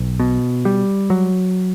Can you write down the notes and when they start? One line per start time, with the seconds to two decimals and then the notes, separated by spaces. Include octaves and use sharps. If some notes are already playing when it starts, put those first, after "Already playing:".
Already playing: B1
0.20 B2
0.65 G3
1.10 F#3